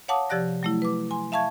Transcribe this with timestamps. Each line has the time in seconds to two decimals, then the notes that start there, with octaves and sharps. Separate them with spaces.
0.08 C#5 F5 F#5 A5 D6 D#6
0.29 C3 F3 G4 D5 F#6 A#6
0.63 F#3 A3 E4
0.82 B4 D6
1.11 G#5 C6
1.32 E5 F5 A5 C#6 G#6